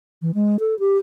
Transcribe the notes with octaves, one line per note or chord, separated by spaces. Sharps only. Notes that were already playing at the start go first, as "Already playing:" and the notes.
E3
G#3
A4
G4